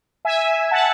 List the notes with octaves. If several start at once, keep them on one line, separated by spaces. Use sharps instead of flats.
E5 G#5
F#5 A5